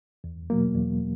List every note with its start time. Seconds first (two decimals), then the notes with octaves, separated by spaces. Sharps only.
0.24 E2
0.50 B2 F#3 A#3
0.75 E2